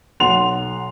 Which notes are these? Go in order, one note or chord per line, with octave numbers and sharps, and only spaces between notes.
B1 F#5 C6 F7